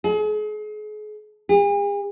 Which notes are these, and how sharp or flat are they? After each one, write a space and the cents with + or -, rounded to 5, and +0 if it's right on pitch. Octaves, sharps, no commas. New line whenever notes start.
G#4 +40
G#4 -45